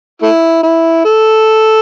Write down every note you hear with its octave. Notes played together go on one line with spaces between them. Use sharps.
A3 E4
E4
A4